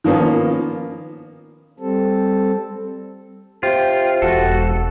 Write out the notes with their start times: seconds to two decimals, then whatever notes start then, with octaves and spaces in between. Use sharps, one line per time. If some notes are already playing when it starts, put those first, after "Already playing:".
0.04 D#3 F3 A#3 B3 C#4
1.79 G3 C4 A4
3.63 C3 F4 G5
4.22 E1 F#4 A4